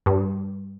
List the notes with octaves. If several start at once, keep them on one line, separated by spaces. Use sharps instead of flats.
G2